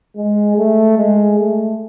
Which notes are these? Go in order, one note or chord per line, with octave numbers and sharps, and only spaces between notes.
G#3
A3
G#3
A3